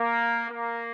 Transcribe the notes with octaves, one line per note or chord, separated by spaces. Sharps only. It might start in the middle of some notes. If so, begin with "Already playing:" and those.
Already playing: A#3
A#3